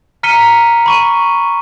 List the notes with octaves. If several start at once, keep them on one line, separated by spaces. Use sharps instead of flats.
A#5 F6 B6 C#7 D#7 G7
B5 C#6 D#7